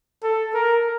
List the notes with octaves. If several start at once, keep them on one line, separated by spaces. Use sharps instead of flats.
A4
A#4